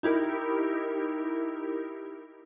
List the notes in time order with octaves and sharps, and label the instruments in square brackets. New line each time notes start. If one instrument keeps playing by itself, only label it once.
[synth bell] D#4 E4 G4 A#4